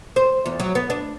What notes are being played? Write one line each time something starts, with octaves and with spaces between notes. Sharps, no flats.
C5
E2
F#3
B3
D4